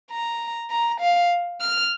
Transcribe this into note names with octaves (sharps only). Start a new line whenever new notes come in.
A#5
A#5
F5
F6